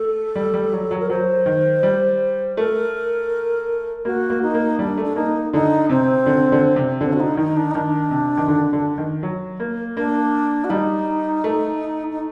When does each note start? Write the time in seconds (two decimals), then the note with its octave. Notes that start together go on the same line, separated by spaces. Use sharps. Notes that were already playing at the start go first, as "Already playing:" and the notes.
Already playing: A3 A4
0.35 G3
0.54 G3
0.72 F#3
0.91 F#3
1.00 A#4
1.09 F#3 C5
1.46 D#3
1.83 G3
2.57 A3 A#4
4.05 A#3 F#4
4.30 A#3
4.42 D#4
4.54 A#3
4.79 G3 D4
4.98 A3
5.04 D4
5.15 A#3 D#4
5.53 D3 D#4
5.89 C3 C4
6.26 D3
6.52 D3
6.76 C3
7.01 D3 C4
7.12 F#4
7.20 D#4
7.37 D#3 D#4
7.56 D4
7.70 D#4
7.74 D#3 D4
8.11 C3
8.37 D#3
8.48 D3
8.73 D3
8.98 D#3
9.23 F#3
9.60 A#3
9.97 A#3 D4
10.64 F#4
10.70 G3 D#4
11.44 A3
12.10 D#4